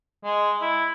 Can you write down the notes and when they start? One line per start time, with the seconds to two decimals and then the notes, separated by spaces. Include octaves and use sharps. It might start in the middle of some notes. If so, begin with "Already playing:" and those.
0.24 G#3
0.61 E4